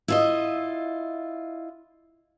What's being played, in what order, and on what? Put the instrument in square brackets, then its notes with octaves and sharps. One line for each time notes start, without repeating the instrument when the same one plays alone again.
[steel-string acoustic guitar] E4 F4 D#5